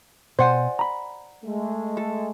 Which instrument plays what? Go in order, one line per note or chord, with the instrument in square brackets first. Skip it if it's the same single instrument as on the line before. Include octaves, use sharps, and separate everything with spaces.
[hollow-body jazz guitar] B2 [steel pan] C5 [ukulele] D5 F#5 G#5
[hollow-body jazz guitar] A#5 B5
[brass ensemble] G#3 A3
[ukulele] A4